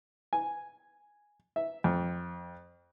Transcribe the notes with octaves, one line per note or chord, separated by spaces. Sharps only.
G#5
E5
F2